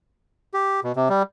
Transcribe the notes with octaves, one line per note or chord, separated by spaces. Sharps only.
G4
B2
C3
G3